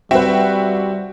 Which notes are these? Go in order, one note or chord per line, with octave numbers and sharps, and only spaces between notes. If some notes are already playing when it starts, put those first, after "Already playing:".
G3 C4 F#4 B4 E5 G5